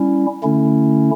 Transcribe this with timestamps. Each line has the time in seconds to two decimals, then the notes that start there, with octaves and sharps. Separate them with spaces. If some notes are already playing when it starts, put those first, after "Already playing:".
Already playing: G3 C#4 E4
0.43 D3 A3 C#4 E4